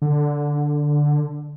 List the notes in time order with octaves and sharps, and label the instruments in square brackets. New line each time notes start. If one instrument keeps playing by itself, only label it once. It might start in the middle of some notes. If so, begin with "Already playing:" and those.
[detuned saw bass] D3